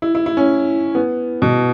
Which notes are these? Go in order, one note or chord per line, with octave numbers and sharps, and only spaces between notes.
E4
E4
E4
C#4
B3
B2